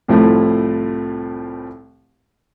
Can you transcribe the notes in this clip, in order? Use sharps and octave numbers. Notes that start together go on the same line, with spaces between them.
C2 A2 F3 A3 C4